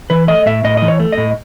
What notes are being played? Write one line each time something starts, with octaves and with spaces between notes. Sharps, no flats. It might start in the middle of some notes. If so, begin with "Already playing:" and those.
E3 B4
A3 D#5
A2 E5
A2 D#5
E3 D#5
C#5
A3
D#5
A2